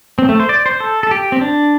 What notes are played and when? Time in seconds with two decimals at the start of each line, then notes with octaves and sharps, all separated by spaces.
0.19 C4
0.29 A3
0.40 C5
0.49 D5
0.66 C5
0.80 A4
1.03 A4
1.11 G4
1.32 C4
1.41 D4